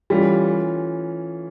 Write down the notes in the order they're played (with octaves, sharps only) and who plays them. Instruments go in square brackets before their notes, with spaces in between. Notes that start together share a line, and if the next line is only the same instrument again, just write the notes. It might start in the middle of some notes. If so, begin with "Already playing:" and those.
[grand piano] E3 A3 C#4 F4 [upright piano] G3